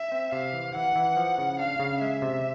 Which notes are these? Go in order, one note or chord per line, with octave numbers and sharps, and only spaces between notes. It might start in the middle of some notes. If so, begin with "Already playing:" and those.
Already playing: E5
C4
C3 F5
E3
E3 F#5
E3
F3
C#3
D4 F5
C#3
G#3 E5
C3